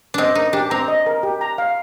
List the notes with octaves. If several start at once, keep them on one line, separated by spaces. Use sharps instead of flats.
C4 D4 D#5
D#4 A#4
D4 G4
C4 A#5
D#5
A#4
G4
A#5
F5